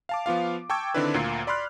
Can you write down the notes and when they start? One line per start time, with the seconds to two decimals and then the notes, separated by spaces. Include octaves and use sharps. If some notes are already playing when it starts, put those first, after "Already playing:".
0.09 F5 A5 D6
0.26 F3 B3 F4 F5
0.70 G5 A5 C#6 D6 E6 G#6
0.94 D3 D#3 C4 D4 E4 B4
1.14 D2 A#2 F4 A#5 C7
1.47 D5 B5 C6 F6 F#6